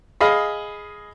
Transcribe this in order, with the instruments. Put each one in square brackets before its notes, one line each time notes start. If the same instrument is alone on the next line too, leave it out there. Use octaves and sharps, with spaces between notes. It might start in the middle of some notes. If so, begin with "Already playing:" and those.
[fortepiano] G#4 D#5 F5 B5